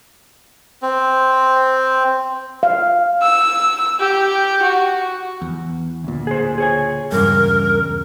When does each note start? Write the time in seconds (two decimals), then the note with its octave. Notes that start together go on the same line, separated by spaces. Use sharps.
0.82 C4
2.63 F5
3.22 E6
4.00 G4
4.62 F#4
5.42 E2
6.04 D2 A#2
6.27 G#4 C5
6.58 G#4 C#5 G#5
7.12 D#1 E2 G2 C#3 A#4